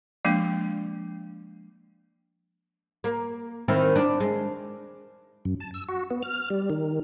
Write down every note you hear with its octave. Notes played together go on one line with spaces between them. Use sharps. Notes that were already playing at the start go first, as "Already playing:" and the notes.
F3 G#3 A#3 D4
A#3
D#3 C4 E4
D4
G#3
F#2
A5
E6
F#4
B3
F6
G3
D#3